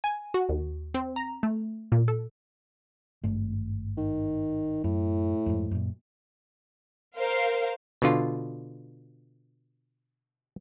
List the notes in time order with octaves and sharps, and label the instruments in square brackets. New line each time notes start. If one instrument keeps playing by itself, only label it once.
[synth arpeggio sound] G#5
F#4
D#2
C4
A#5
A3
A#2
A4
[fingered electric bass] G#1 G2 A3
[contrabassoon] D#3
[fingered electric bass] F#2 [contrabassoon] A2
[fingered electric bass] F2 G#2
F#2 A#2
[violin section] A#4 C5 F5
[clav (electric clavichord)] B2 D3 F4